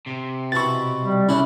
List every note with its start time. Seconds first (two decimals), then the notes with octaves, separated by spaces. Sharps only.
0.07 C3
0.52 B2 E4 C#6 A6
1.03 G3
1.29 C#3 C#4 D4 E4